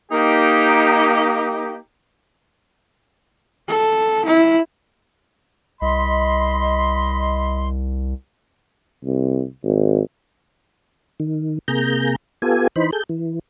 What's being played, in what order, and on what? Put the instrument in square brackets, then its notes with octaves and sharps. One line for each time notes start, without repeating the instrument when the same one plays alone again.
[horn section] A#3 D#4 G4
[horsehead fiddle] A4
E4
[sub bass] C2 [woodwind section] D#5 B5 C6
[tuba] C2
G#1
[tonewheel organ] D#3
C3 A#3 G#4 A#5 G6
B3 F4 G4 A4 G#5
E3 D#4 C5 B5
G#4 A4 G6
E3